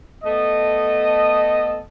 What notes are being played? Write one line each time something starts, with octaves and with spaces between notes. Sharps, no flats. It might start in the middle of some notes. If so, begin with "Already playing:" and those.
A3 B3 A4 D#5